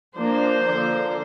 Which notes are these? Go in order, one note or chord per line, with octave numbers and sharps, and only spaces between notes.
F3 A#3 D4 C5
D3 F3 A#3 D4